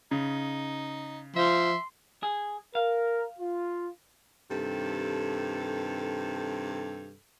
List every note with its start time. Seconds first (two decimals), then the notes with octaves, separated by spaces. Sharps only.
0.11 C#3 D#4
1.36 F3 E5 C6
2.23 G#4
2.75 A#4 F5
3.39 F4
4.51 G2 C3 D#3 A4